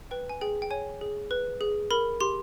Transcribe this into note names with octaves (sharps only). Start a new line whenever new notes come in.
B4 G5
G#5
G#4 G5
G5
C#5 G#5
G#4
B4
G#4
A#4 B5
G4 C6